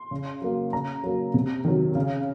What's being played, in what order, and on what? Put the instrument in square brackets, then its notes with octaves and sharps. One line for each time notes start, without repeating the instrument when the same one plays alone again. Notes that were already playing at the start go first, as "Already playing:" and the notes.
Already playing: [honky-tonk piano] C6
C#3
F#3 A#3
C#3 A#5
F#3 A#3
C3
D#3 F#3
C#3